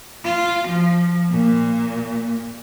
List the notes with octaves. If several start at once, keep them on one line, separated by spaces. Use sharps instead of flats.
F4
F3
A#2